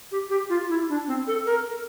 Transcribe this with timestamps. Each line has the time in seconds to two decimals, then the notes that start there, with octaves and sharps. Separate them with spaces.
0.12 G4
0.30 G4
0.49 F4
0.69 E4
0.89 D4
1.08 C4
1.27 A4
1.46 A#4